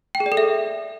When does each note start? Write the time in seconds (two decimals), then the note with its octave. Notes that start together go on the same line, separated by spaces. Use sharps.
0.15 G5
0.20 G#4
0.26 D5
0.32 A4
0.37 E5